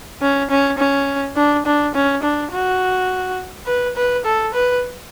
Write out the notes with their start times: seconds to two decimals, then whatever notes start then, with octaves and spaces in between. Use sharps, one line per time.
0.22 C#4
0.50 C#4
0.79 C#4
1.36 D4
1.66 D4
1.95 C#4
2.23 D4
2.52 F#4
3.67 B4
3.96 B4
4.25 A4
4.54 B4